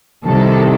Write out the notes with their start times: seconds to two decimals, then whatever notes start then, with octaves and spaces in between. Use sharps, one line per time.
0.25 C2 C3 D#3 A4